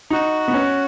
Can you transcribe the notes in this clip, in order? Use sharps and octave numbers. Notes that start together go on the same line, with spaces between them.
D#4 F#4
B3
C#4